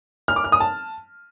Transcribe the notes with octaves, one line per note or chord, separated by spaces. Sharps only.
F6
D6
F6
D#6
A5